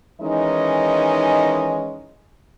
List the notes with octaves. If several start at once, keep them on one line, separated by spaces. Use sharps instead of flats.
D#3 E3 G#3 C#4 D#4 D#5